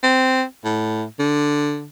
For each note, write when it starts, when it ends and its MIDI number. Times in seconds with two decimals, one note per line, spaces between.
0.03 0.44 60
0.65 1.05 45
1.19 1.87 50